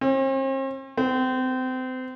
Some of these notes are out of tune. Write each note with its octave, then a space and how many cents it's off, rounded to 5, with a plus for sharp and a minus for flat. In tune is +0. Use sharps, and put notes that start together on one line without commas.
C4 +45
C4 -30